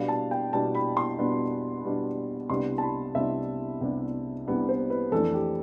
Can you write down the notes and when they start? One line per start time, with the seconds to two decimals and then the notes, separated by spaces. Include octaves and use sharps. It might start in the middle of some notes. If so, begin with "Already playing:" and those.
Already playing: B2 G3 B3 D4 F5
0.08 A5
0.31 G5
0.53 B2 G3 B3 D4 A5
0.75 B5
0.97 C6
1.19 B2 G3 B3 D4
1.84 B2 G3 B3 D4
2.50 C2 C3 G3 B3 D4 C6
2.78 A5
2.82 B5
3.15 C2 C3 G3 B3 D4 E5
3.81 C2 C3 G3 B3 D4
4.47 C2 C3 G3 B3 D4
4.69 C5
4.90 B4
5.12 F2 E3 A3 D4 A4
5.34 G4